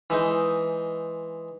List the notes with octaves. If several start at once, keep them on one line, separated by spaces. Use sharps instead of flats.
E3 G#3 D#4